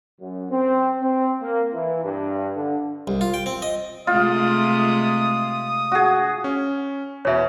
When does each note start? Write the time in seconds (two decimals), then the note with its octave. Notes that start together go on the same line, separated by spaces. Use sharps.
0.20 F#2
0.50 C4
1.02 C4
1.42 A#3
1.73 E3
2.04 G2
2.56 D3
3.07 C2
3.21 F4
3.34 G5
3.46 C4
3.62 D#5
4.07 C3 G#3 A3 F4 D#6
5.92 F#4 G#4
6.44 C#4
7.25 E2 B2 C#5 E5